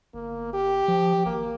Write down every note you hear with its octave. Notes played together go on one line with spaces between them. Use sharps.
G1 A#3
G4
F3
G#1 A#3